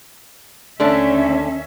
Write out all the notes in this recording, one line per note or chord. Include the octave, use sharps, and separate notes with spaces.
D#2 D3 A3 C#4 D4 E5